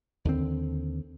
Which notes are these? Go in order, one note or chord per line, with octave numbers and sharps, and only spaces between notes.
D#2 D3 C4